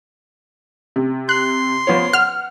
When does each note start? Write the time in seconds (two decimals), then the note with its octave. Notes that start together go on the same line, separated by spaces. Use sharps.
0.96 C3
1.29 C6 F#6
1.87 F3 B3 C#5
2.13 F#5 F6